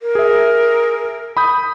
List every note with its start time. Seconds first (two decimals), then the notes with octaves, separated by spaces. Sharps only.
0.01 A#4
0.15 G#4 E5
1.37 B5 D#6 G6